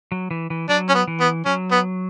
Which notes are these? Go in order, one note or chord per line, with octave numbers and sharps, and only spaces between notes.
F#3
E3
E3
F#3 D4
C#4
B3
E3
B3
F#3 C#4
B3